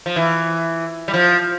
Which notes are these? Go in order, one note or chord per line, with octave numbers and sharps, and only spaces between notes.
F3
E3
G3
F3